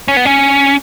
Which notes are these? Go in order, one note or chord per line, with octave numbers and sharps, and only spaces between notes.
C#4
B3
C#4